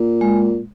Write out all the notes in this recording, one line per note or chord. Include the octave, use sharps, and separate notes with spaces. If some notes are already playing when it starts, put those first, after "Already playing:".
Already playing: A#2
G#3